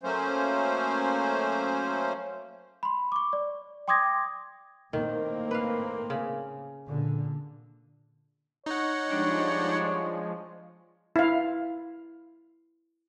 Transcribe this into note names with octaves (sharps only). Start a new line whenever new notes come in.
F#3 A3 A#3 C#4 C5
B5 C6
C#6 D6
D5
G5 C6 D6 D#6 G#6 A#6
A2 D#3 A#3 C4
B4 F5
C#3
A#2 D3
D#4 C#5 F#5
F3 G3 G#3 D4
E4 F5